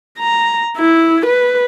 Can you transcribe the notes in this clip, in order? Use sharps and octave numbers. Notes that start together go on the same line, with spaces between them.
A#5
E4
B4